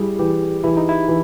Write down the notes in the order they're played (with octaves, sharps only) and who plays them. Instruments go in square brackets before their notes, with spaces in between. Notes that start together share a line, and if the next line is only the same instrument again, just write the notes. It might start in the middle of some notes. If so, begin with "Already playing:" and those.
Already playing: [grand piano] G3 [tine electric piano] E4 G4 G#4
[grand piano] E3 [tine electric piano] G4
[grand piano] E3 [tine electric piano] E4
[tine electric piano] D#4
E4
[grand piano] E3